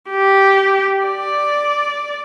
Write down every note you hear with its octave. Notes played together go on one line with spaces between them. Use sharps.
G4
D5